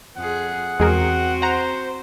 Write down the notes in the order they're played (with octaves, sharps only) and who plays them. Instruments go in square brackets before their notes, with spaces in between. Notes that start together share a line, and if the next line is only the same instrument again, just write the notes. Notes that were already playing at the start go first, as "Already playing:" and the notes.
[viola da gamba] F2 G#4 [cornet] F#5
[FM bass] E2 [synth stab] G#3 G#4 A#4 [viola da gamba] C4 F#4
[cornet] C5 [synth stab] F#5 A#5